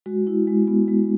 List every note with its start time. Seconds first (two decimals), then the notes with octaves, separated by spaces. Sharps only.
0.06 G#3 F#4
0.27 E4
0.47 G#3
0.67 B3
0.88 G#3